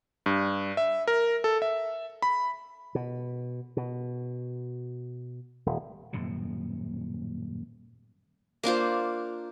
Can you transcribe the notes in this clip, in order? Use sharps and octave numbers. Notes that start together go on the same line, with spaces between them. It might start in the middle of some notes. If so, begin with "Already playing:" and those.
G2
E5
A#4
A4
E5
B5
B2
B2
D#1
D#1 F#2 A2 C3
A#3 D4 F4 C5